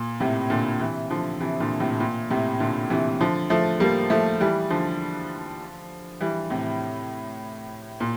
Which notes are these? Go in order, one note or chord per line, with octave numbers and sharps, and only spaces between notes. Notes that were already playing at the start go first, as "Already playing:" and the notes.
Already playing: A#2
A2 C3
A#2 D3
C3 E3
D3 F3
C3 E3
A#2 D3
A2 C3
A#2
A2 C3
A#2 D3
C3 E3
D3 F3
F3 A3
G3 A#3
F3 A3
E3 G3
D3 F3
E3 G3
A2 C3
A#2